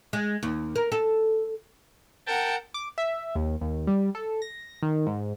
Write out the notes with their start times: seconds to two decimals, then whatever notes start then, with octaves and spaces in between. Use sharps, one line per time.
0.13 G#3
0.43 D#2
0.76 A#4
0.92 A4
2.27 A#4 F#5 G5 A5
2.74 D6
2.98 E5
3.35 D#2
3.61 D#2
3.87 G3
4.15 A4
4.42 A#6
4.83 D#3
5.07 G#2